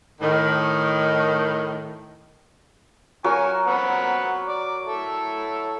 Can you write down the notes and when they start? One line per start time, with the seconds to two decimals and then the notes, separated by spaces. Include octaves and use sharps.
0.21 A2 D#3
3.24 F#3 A#4 G#5 C#6
3.67 C4 F#5 B5
4.48 D5 D6
4.85 E4 A4 E5